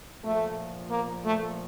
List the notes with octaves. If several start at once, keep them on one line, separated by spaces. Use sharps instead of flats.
A#2 F3 A3
A#3
A3